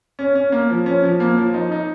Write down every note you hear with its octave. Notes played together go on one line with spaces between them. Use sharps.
C#4
C#4
A#3
F3
C#4
F3
A#3
F3
D#4
D#4